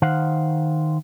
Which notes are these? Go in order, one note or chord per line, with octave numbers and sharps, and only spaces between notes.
D#3 C5 F5 F#5